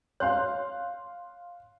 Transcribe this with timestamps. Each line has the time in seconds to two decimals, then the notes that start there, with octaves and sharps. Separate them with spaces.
0.20 C#5 F5 C6 F#6